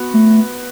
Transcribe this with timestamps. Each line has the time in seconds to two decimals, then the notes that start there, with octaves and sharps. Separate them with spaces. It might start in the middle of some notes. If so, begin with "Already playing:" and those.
Already playing: B3 F#4
0.14 A3